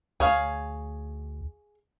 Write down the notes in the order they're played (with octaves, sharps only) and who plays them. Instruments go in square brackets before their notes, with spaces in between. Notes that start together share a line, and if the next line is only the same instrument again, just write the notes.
[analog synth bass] D2 [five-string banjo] G#4 C#5 F5